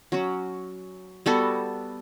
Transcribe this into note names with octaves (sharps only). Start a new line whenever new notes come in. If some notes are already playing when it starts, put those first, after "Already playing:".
F#3 C#4 F#4
G3 B3 F#4 A4